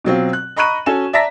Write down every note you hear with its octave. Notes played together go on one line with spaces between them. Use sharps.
B2 F#3 C4 F4
F#6
D#5 A#5 B5 C#6 F#6 D#7
C#4 F#4 A4 G#5 E7
D5 E5 A5 A#5 A#6 B6